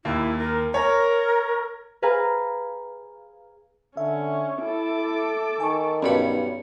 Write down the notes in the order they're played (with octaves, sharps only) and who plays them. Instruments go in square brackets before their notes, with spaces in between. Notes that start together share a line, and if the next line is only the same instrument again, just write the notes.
[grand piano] D#2 A#3 [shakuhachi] E4
[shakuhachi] A#4
[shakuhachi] A#4 [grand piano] C#5 A#5
[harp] G#4 B4 F5 G#5 A#5
[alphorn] D3 [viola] C#4 [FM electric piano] E5
[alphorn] E4 [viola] A4 D6
[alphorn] D#3 [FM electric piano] G#5 A5 C#6
[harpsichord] B1 G2 B5 [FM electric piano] C#4 D5 C#7